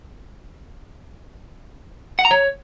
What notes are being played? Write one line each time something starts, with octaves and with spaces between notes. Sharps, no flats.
F#5
A#5
C#5